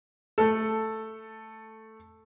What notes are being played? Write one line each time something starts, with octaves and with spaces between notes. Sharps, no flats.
A3 A4